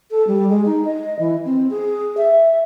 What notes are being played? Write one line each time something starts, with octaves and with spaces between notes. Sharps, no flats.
A4
G3
G#3
D#4
D#5
E3
C4
G#4
E5